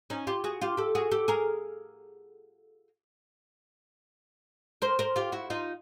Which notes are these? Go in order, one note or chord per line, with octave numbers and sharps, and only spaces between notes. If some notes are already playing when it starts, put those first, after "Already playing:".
C#4 D#4
F4 G4
F#4 G#4
F4 G4
G4 A4
F#4 G#4
G4 A4
G#4 A#4
A#4 C5
A#4 C5
F4 G4
E4 F#4
D#4 F4